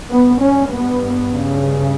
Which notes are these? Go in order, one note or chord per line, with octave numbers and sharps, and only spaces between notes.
G2 B3
C#4
B3
C#3